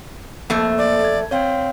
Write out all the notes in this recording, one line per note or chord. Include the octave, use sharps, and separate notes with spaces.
F2 A3 A#3
D5
G#6
C4 C#5 F5